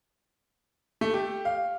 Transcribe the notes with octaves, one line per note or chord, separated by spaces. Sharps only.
A3
G4
F5